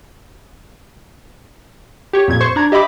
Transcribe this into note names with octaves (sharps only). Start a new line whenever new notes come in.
G4 C#5
F2 A#2 G#6
C5 C#6
D4 A#5 G#6
G4 D#5 E5 B5 D6